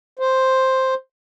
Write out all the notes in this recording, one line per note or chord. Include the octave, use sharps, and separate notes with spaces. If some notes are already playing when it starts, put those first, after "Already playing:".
C5